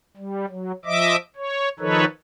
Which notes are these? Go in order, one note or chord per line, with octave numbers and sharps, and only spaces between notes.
G3
F#3
F3 D#5 E5 D6
C#5
D#3 F3 D#4 A4 B4 C#5